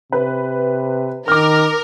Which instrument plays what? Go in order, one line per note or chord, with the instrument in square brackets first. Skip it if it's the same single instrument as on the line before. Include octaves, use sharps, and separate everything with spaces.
[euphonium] C3 [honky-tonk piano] B4
[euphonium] D#3 [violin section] A#4 [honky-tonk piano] D6 F6